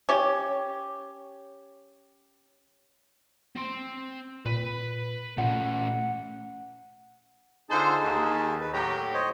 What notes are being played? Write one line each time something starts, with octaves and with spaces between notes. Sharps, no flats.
C#4 G4
C4 C6
A#2 B4
A#2 A3 C#4 F#5
D3 D#4 F4 G#4 C5 A5
D#2
B4
A2 F#3 G4 C#5 A#5
C5 C#5 D#5